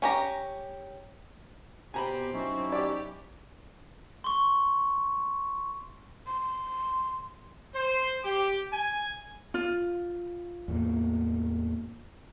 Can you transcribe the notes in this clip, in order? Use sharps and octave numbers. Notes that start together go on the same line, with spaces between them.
C#4 G4 A#5
B2 C4 G4 G#5 A#5 B5
F#3 C#4 D#4 E4
G4 D5 D6
C6 C#6
C6
C5
G4
G#5
F4
E2 A2 A#3